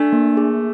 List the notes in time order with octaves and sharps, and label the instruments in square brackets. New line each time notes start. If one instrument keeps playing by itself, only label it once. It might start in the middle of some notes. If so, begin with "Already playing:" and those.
Already playing: [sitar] A3 [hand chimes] D4
[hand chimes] A#3
G#4